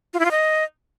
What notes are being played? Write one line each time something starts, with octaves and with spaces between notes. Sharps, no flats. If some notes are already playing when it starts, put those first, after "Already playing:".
F4
E4
F4
D#5